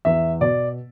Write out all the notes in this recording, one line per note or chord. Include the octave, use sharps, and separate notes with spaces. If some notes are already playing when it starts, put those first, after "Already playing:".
E2 E5
B2 D5